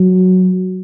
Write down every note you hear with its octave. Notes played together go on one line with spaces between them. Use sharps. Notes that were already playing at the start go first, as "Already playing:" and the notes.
Already playing: F#3